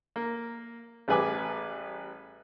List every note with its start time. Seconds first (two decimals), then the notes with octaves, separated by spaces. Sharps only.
0.16 A#3
1.08 A1 G3 G#4 B4 G#5 D6